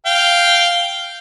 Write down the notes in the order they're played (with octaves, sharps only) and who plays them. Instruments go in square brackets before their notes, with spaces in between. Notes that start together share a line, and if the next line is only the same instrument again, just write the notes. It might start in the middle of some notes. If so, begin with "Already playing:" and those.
[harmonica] F5 G5